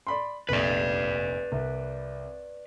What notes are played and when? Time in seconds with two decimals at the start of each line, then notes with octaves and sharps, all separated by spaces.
0.07 D5 B5 C6
0.49 F1 A#1 B4 D5
1.52 C2